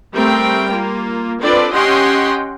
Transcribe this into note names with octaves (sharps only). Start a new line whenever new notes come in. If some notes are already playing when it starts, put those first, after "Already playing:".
G3 A3 C4 A#4 G5
A#3 F4
C4 D4 F4 A4 B4 D5
C#4 G4 D#5 F#5 G5 C6